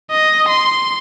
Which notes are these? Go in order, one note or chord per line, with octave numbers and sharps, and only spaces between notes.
D#5
C6